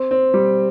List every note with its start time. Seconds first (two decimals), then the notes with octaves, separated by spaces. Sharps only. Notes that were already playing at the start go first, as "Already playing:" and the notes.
Already playing: C4
0.11 C4
0.34 G3